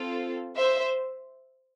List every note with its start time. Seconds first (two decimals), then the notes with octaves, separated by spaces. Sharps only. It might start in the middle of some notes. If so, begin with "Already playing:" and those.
Already playing: C4 F4 A4
0.56 C5 E5